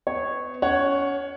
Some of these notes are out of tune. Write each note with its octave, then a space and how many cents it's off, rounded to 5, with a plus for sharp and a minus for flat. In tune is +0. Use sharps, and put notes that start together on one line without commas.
B3 +35 C#5 -10
C#4 +30 C#5 +0 F#5 +0